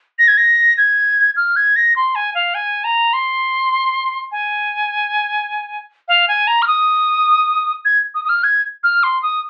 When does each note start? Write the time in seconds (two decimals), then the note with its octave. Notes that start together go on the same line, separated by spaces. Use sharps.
0.19 A#6
0.28 G#6
0.37 A#6
0.78 G#6
1.37 F6
1.56 G#6
1.76 A#6
1.96 C6
2.15 G#5
2.35 F5
2.55 G#5
2.84 A#5
3.13 C6
4.32 G#5
6.08 F5
6.28 G#5
6.47 A#5
6.62 F6
6.67 D#6
7.85 G#6
8.15 D#6
8.25 D#6
8.29 F6
8.44 G#6
8.84 F6
9.03 C6
9.23 D#6